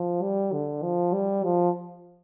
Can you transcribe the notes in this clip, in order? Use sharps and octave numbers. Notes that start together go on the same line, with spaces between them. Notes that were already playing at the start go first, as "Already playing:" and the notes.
Already playing: F3
G3
D3
F3
G3
F3